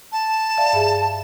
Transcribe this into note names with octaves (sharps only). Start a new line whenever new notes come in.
A5
D5 E5 F5
G2 G#4 E5